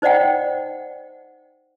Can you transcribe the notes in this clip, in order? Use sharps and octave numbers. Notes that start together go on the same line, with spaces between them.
D#4 C5 D5 D#5 F#5 G5